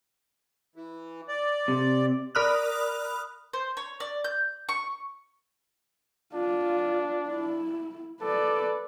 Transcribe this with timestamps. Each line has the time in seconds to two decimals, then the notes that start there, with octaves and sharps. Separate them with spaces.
0.76 E3
1.28 D5
1.68 C3
2.35 A#4 D5 B5 D#6 F6 F#6
3.53 C5
3.77 C#5
4.00 D5
4.24 G6
4.69 C#6
6.34 D4 F4
7.29 E4
8.21 A4 B4 D5